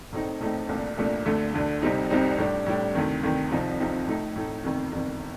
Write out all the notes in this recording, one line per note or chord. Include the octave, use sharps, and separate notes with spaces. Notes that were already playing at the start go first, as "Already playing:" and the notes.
A#1 A2 A3 C4 D#4
A#1 A2 A3 C4 D#4
C2 A#2 A3 D4
C2 A#2 A3 D4
D2 D3 A3
D2 D3 A3
C2 C3 G3 C4 D#4
C2 C3 G3 C4 D#4
A2 G3 D4
A2 G3 D4
D2 C3 D#3
D2 C3 D#3
C2 C3 F3 C4 D#4
C2 C3 F3 C4 D#4
A2 A3 D#4
A2 A3 D#4
G1 F2 C3 D#3
G1 F2 C3 D#3